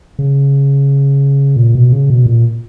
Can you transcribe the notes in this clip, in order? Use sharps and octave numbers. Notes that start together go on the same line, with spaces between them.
C#3
A#2
B2
C#3
B2
A#2